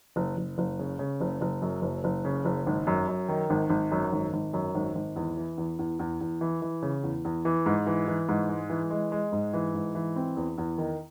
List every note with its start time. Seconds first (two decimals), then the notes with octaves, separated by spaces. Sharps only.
0.16 F#1
0.37 F#1
0.58 F#1
0.79 C#3
0.99 C#3
1.21 F#1
1.41 F#1
1.62 F#2
1.82 F#1
2.04 F#1
2.25 C#3
2.45 F#1
2.67 G#1
2.87 F#2
3.08 F#2
3.29 D#3
3.50 G#1
3.70 G#1
3.92 F#2
4.12 G#1
4.33 G#1
4.54 F#2
4.75 G#1
4.95 G#1
5.16 E2
5.37 E3
5.58 E2
5.79 E2
5.99 E2
6.21 E2
6.41 E3
6.62 E3
6.83 C#3
7.03 E2
7.25 E2
7.45 E3
7.66 G#2
7.87 E3
8.08 E3
8.29 G#2
8.49 G#3
8.70 E3
8.91 G#3
9.12 G#3
9.32 G#2
9.54 E3
9.74 G#2
9.95 E3
10.16 C4
10.37 E2
10.58 E2
10.78 D#3